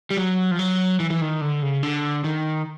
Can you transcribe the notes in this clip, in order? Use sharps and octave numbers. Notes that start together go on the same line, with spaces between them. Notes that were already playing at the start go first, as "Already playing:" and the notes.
G3
F#3
F3
F#3
E3
E3
D#3
D3
C#3
D3
D#3